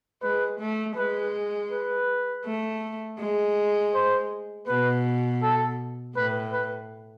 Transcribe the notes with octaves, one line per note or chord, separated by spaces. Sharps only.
G#3 B4
A3
G#3 B4
B4
A3
G#3
C5
B2 B4
A4
A2 B4
B4